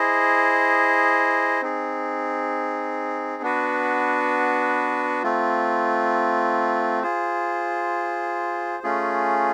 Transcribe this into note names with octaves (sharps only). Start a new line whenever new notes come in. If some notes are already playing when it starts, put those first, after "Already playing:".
Already playing: E4 G#4 C5 D#5
C4 D#4 G#4
B3 D4 F#4 B4
A3 C4 F4
F4 G#4 C5
A3 C#4 F4 G#4